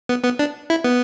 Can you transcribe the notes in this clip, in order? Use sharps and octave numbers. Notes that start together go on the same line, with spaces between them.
B3
B3
D4
E4
B3